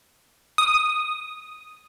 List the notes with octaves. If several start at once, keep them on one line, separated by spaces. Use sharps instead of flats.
D#6